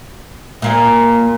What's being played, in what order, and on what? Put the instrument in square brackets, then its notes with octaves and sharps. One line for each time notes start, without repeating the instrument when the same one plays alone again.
[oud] A#2 A#3 F4